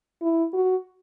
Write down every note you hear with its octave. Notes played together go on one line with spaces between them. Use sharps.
E4
F#4